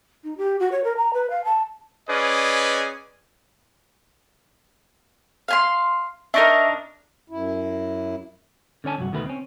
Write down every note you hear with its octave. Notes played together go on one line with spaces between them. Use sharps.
D#4
G4
F#4
C#5
A#4
A#5
B4
F5
A5
C#4 G#4 B4 D5 D#5
F5 G#5 C6
D4 D#4 A#4 E5 C#6 A#6
F#2 E4
D3 C#4 C#5 G#5 A5
C2 G2 F#3 F#4
D2 B2 D#3 A3 G#4 B4
C4 C#4